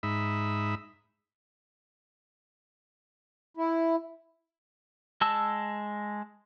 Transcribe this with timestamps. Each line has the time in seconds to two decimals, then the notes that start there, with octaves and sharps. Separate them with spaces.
0.03 G#2 D#4 E5 B5
3.57 E4
5.21 G#3 A5 E6